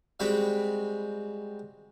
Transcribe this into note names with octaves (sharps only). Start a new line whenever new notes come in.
G3 G#3 C4 F#4 G5 B5